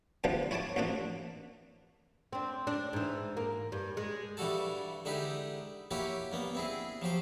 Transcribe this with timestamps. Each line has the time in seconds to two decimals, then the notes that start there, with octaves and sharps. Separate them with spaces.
0.24 E2 G#2 B2 D3 F3 G3
0.51 E4 C#5 G#5 A5 D6
0.76 A1 F2 A2 A3 A#3 D4
2.33 C4 D4
2.67 D4
2.93 G#2 E3
3.37 A#3
3.72 G2
3.97 G#3
4.37 G2 E3 G3 F#4 A4 A5
5.05 D3 G#3 D#4 E4 G4 B4
5.91 A#3 E4 F#4 G4 C#5
6.32 G2 A#3 B3
6.55 C4 E4 G#4
7.02 F3 F#3 G4 C5